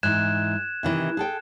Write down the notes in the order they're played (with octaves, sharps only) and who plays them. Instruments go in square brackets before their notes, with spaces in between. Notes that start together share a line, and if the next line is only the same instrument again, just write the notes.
[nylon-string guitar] G#2 E3 [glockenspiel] F#6 G#6 E7
[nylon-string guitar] C3 D#3 E3
G#4 A4 G5